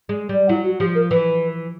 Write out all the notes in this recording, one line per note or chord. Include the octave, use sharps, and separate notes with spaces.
G#3
G3
F#3 E4
F#4
F3 G4
A#4
E3 B4